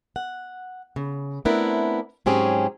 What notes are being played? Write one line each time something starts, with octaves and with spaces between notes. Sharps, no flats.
F#5
C#3
A3 B3 C4 D4 E4 A#4
G#2 F#3 C4 C#4 G4 G#4